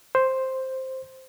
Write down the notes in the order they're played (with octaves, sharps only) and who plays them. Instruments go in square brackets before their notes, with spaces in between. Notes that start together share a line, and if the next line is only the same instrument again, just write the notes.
[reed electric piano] C5